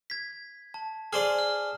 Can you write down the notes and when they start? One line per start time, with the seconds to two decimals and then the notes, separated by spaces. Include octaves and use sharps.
0.10 G#6 B6
0.74 A5
1.13 G#4 C5 D5 F6
1.39 F6